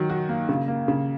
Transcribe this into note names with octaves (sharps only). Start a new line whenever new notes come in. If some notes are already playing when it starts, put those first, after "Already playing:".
Already playing: D#3 F#3
F#4
A#3
C#3
A#3
C#3